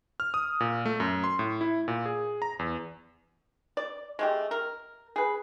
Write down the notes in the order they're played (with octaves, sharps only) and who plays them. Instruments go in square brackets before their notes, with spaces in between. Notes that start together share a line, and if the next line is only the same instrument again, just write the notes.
[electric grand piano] F6
D#6
A#2
A3
F#2
C6
A2
E4
A#2
G#4
A#5
E2
[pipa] D5
G#3 A3 G4
A#4
G#4 B4